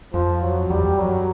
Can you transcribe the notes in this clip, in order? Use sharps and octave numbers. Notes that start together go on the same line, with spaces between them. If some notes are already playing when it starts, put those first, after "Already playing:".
F2 F3
F#3
E2 G3
F2
F#2 F#3